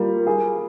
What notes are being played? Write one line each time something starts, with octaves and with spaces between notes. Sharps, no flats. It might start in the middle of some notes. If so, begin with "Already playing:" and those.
Already playing: G3 A#3 F4
G#4